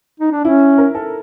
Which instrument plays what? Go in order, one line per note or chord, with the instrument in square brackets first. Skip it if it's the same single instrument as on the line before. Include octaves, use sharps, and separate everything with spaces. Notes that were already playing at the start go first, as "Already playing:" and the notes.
[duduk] D#4
D4
[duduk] C#4 [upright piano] E4
[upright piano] A#4
A4